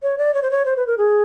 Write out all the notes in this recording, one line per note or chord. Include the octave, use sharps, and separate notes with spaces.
C#5
D5
C#5
C5
C#5
C5
B4
A#4
G#4